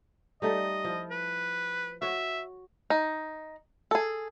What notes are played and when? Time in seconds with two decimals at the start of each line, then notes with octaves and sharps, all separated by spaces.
0.42 G3 A3 D#4 D#5
0.84 F3 E4
1.11 B4
2.02 F#4 C#5 E5
2.90 D#4
3.91 G#4 A4